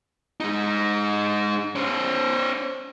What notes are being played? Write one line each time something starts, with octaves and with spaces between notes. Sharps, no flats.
G#3 D#4
C#4 C5